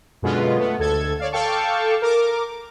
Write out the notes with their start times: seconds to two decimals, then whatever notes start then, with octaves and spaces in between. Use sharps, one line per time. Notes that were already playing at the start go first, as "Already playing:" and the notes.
0.22 F#2 B2 D3 G#3 B3 F4
0.58 A3 B3
0.79 D2 A4 G#6
1.19 C#5 D5 F5
1.32 A4 F5 G5 A5 C#6 D6
2.02 A#4 D6